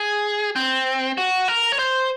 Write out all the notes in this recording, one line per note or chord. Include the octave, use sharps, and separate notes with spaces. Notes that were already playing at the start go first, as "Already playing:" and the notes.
Already playing: G#4
C4
F#4
A#4
C#5
C5